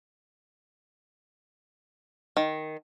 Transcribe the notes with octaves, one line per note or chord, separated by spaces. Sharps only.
D#3